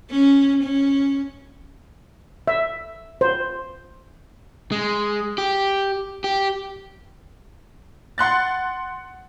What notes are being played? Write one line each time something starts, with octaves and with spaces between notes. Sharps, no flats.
C#4
C#4
E5
C5
G#3
G4
G4
F#5 C6 F#6 A6